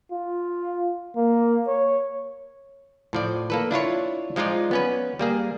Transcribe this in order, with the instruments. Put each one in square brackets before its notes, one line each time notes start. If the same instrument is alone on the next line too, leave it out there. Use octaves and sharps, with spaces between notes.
[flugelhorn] F4
A#3
C#5
[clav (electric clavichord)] A2 F3 D5
A#3 A4 B4
D4 E4 F4 C#5
F3 G#3 D#4 F4 D5
B3 C#4 B4
G3 A#3 G#4